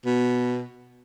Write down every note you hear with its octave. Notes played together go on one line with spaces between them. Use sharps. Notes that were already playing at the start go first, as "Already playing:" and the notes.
B2